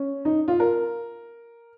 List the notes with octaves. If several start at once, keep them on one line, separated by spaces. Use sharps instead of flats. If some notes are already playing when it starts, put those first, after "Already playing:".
Already playing: C#4
D#4
F4
A#4